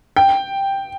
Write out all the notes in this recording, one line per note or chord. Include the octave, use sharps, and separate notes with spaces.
G5